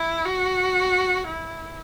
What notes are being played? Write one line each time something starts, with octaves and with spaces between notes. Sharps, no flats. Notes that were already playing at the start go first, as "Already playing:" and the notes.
Already playing: E4
F#4
E4